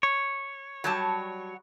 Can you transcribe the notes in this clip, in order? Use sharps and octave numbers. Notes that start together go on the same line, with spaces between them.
C#5
F#3 G3 A5